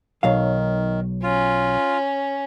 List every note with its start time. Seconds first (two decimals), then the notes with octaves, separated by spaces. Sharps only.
0.23 B1 D#3 F#3 F5
1.23 C#4 F4